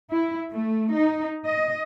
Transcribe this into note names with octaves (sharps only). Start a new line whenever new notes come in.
E4
A3
D#4
D#5